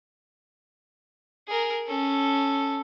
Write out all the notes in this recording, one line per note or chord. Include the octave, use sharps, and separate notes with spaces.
G#4 A#4
C#4 A4